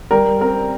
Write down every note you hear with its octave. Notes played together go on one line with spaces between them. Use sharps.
G3 A#4
C4 A#4